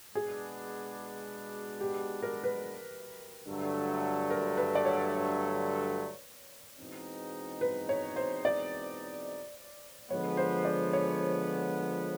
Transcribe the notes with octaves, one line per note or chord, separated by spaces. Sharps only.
B2 G#3 B3 D4 G#4
G4
A#4
B4
G2 D3 F#3 A3
A#4
B4
D5
C#5
E2 B2 G#3 C4 D#4
B4
C#5
C5
D5
D3 F3 G#3 B3 C#5
C5
D5
C#5